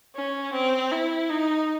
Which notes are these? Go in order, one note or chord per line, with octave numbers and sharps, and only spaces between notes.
C#4
C4
E4
D#4